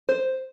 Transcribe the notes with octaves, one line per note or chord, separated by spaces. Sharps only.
C5